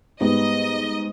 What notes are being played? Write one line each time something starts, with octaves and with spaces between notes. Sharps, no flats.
G#2 G3 B3 D#5